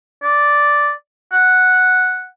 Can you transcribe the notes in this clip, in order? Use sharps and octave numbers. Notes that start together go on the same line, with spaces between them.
D5
F#5